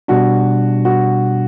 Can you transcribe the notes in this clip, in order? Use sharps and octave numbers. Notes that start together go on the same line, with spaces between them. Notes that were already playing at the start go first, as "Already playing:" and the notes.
B2 G3 D4 F#4
F#4